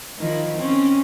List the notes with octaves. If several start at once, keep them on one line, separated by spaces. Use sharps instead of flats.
D#3 F3 E4
C4 C#4